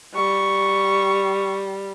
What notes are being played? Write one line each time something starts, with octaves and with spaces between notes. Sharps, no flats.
G3 C#6